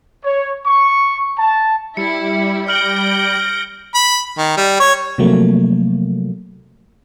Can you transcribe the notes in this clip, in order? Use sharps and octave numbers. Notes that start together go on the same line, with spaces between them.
C#5
C#6
A5
G3 E4 C#7
F6 G6 A#6 D7 F#7 G7
B5
D#3
G3
C#5
C3 F3 F#3 A3 A#3